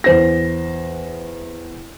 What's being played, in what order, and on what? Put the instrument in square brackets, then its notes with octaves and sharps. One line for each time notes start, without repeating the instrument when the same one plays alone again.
[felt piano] E2 C5 A#6